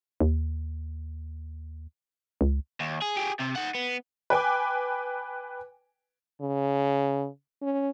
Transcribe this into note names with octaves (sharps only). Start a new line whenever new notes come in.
D#2
C#2
D#2
G#4
G4 G#4
C3
D#4 F#5
B3
B4 G5 G#5 D6
C#3
C#4